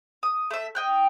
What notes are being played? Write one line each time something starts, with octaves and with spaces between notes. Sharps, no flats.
D#6
A3 E5
D#5 G5 F#6